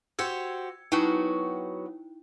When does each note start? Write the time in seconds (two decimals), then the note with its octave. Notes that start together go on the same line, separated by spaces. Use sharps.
0.19 F#4 G4 C5 E6 G#6 C#7
0.92 F#3 B3 D#4 E4 F#4 G5